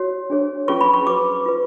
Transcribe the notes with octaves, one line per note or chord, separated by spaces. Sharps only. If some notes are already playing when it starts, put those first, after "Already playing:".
Already playing: F#4 C#5
D4 G#4 C#5
C#4 F4 G#4 B4 C#6
B5
C#6
F#4 B4 D6
F4 B4